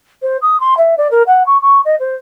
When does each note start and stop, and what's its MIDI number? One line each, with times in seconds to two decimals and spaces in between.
0.22 0.37 72
0.42 0.60 87
0.60 0.74 84
0.78 0.95 76
0.98 1.08 74
1.11 1.23 70
1.27 1.43 78
1.47 1.60 85
1.62 1.81 85
1.85 1.96 75
2.00 2.16 72